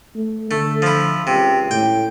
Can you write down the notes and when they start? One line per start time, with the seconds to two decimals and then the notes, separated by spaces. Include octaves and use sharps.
0.15 A3
0.51 D3 A3
0.82 F3 E4
1.27 C#2 C3
1.71 A2 G5